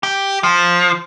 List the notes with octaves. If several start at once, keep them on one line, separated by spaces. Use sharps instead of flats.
G4
F3